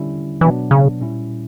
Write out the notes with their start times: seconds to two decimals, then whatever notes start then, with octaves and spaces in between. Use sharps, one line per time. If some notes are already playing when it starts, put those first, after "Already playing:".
Already playing: D3 G3 C#4 E4
0.41 B2 E3 F#3 B3 D4
0.71 C#3
1.00 A#2 G3 C#4 E4